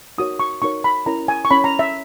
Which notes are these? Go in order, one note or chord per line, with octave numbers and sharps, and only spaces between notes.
D#4 F#4 A#4 C#5 D#6
C#6
D#4 F#4 A#4 C#5 C#6
B5
C#4 E4 A#4 C#5 A#5
G#5
C#6
C#4 E4 A#4 C#5 B5
A#5
E5